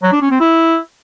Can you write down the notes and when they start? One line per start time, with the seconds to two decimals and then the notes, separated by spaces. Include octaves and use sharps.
0.03 F#3
0.12 D4
0.22 C#4
0.31 C4
0.40 E4